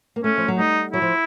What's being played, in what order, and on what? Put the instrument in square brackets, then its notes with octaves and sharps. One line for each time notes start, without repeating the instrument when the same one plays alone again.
[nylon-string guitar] A#3
[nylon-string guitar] A3 [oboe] C#4
[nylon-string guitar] F3
F#3
[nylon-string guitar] G3 [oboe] D#4
[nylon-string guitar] F#3 [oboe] E4
[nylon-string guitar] F3